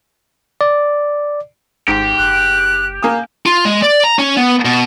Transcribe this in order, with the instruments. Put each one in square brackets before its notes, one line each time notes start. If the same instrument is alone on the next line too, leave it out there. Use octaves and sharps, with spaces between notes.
[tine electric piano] D5
[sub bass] G#1 [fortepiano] G#2 [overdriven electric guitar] G4
[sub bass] F#1 [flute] F#6
[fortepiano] A#3 G#5 D#6
[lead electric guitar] F4
G#3
D5
A#5
C#4
B3
B2